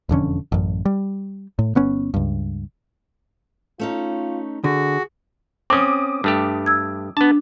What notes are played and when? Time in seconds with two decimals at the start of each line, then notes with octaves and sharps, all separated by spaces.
0.09 E1 F2 D3 C#4
0.52 A1 F#2
0.85 G3
1.59 A2
1.75 G1 B3 C#4
2.14 C#2 G2
3.80 A3 C#4 D#4 F4
4.64 D3 F#4 G#4
5.70 C4 C#4 D6 D#6
6.24 G2 A3 G4
6.66 E6 G#6
7.17 B3 D4 A5